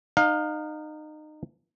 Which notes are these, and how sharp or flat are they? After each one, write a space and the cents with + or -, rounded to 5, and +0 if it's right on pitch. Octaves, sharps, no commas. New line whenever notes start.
D#4 -25 F5 +20